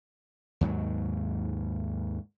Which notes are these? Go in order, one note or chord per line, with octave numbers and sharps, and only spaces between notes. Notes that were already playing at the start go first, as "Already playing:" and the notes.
D#2 G#2 F#3